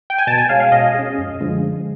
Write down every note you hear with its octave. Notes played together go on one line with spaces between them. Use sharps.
G5
G#5
B2 A5
G#5
G#3 C#4 F5
F5
B2 D#5
G#3 C#4
F#2
D3 F3 G#3